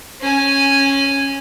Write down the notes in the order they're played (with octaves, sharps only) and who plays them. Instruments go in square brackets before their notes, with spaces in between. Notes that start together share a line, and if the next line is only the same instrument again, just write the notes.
[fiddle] C#4 G#5